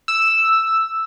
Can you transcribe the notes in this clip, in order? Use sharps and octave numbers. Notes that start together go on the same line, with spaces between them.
E6